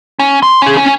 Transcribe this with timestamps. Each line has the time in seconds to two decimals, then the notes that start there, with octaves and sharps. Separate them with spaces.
0.19 C#4
0.43 C6
0.62 C#4 G#4
0.77 C#4 G#5